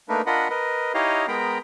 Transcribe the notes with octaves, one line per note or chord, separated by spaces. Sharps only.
A3 A#3 D4 D#4 A#4 B4
D4 F4 A#4 D#5 F#5 B5
A#4 B4 D#5
D#4 E4 G4 C#5 D#5 F5
G#3 B3 A#4 G5 A#5 B5